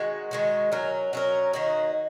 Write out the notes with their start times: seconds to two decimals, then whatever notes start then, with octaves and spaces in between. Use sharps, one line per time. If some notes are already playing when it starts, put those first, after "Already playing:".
Already playing: D#3 G#3 F#4
0.31 D#3 G#3 F#4
0.72 F#3 C#4 A#4
1.13 F#3 C#4 A#4
1.53 D#3 A#3 D#4 F#4